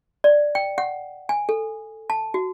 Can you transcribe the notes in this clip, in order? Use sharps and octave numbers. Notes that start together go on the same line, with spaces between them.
D5
G5
F#5
G#5
A4
A5
F#4